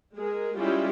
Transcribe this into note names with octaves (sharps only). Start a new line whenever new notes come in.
G#3 G#4 A#4
G3 G#3 C#4 E4 F4 G4